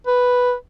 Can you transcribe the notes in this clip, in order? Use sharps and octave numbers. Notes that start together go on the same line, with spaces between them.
B4